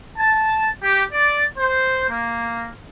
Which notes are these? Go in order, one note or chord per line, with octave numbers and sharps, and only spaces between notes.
A5
G4
D5
C5
A#3